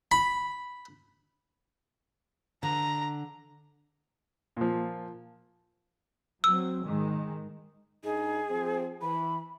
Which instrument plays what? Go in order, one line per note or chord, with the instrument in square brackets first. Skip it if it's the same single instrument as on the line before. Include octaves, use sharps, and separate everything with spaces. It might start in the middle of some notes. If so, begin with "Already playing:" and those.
[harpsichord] B5
[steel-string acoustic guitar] D3 [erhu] A#5
[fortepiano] A#2 F3
[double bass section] F#3 C4 [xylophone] E6
[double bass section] G#2 D#3 G#3
[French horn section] G2 D#4 [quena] G#4
[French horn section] F3 C4
[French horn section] E3 [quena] B5